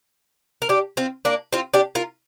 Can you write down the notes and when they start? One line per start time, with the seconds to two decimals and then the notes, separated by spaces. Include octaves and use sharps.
0.62 A#4
0.69 D4 G4
0.97 C4 F4
1.25 A#3 D4
1.53 C4 F4
1.74 D4 G4
1.95 F4 A#4